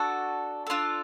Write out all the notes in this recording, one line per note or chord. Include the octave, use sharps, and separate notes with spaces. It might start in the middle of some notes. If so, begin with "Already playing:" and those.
Already playing: D4 F#4 A4
D4 F4 A4